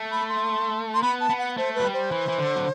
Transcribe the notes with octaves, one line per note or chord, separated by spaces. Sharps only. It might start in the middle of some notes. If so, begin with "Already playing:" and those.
Already playing: A3
B5
C6
C6
B3 B5
A5
B3
F#5
A3 C5
F#3 B4
G3
C5
E3
E3
D3
F#3